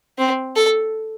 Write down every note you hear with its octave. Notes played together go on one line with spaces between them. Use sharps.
C4
A4